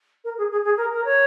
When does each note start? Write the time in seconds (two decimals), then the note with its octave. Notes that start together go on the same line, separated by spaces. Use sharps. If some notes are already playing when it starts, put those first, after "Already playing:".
0.24 A#4
0.37 G#4
0.51 G#4
0.64 G#4
0.77 A#4
0.92 A#4
1.04 C#5